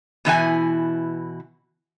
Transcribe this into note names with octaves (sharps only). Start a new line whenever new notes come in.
B2 E3 E4 G#5